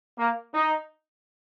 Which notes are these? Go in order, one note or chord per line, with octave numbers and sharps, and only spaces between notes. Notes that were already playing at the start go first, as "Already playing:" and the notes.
A#3
D#4